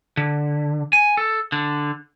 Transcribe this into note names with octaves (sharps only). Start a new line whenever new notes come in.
D3
G#5
A4
D3